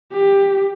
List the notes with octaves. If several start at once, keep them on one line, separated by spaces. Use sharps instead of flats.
G4